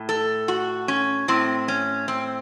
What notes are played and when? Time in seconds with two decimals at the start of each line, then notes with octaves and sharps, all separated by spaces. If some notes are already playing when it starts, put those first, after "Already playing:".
Already playing: A2
0.09 A4
0.48 F#4
0.88 C#4
1.28 A2 C4
1.68 C#4
2.08 C4